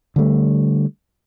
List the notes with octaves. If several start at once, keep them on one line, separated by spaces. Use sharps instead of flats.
D3 G3 A3